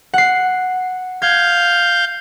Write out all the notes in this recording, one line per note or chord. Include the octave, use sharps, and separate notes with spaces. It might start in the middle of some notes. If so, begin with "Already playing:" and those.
F#5 C7
F5 G6 G#6